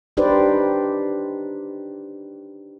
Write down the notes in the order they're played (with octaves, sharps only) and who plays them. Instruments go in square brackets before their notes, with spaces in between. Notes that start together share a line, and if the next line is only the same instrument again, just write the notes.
[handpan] D4 D#4 G4 B4 C5 D5